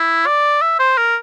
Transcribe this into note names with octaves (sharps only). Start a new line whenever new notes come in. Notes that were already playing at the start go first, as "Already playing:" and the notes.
Already playing: E4
D5
E5
C5
A#4